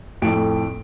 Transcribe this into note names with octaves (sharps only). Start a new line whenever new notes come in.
F2 A2 A4 D7